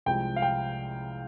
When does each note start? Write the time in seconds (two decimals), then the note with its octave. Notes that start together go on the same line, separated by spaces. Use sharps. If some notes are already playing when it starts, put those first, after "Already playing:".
0.06 C2 C3 F3 G#3 C4 G5
0.36 F5
0.42 G5